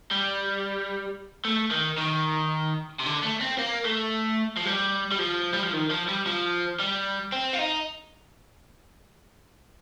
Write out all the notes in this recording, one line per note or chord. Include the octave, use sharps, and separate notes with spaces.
G3
A3
D#3
D#3
C3
D3
A3
C4
A#3
A3
F3
G3
G3
F3
G3
F3
D#3
F3
G3
F3
G3
C4
F4
D#4